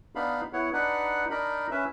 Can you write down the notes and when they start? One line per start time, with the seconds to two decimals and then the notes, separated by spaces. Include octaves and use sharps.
0.15 B3 D4 D#4 F5 B5
0.53 B3 E4 C#5 F#5
0.73 D4 D#4 B4 F#5
1.31 D4 D#4 A#4 B5
1.71 C#4 B4 E5